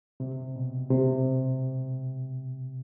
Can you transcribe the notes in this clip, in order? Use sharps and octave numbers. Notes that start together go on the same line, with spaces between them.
C3
B2
C3